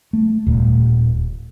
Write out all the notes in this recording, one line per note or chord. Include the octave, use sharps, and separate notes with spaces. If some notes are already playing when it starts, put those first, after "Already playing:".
A3
D#1 A#2